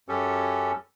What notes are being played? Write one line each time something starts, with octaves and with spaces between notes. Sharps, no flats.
F#2 C#4 G4 A4